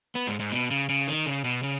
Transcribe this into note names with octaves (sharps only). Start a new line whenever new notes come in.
B3
G#2
G#2
B2
C#3
C#3
D#3
C#3
B2
C#3